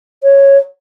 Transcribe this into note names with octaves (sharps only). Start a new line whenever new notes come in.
C#5